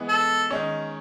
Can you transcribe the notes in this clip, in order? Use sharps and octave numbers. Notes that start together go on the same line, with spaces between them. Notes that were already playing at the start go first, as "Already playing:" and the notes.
Already playing: E3 G#3 B3 E4
A4
D#3 G#3 C#4